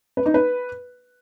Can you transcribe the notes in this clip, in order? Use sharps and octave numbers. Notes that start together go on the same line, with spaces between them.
B4
D#4
B4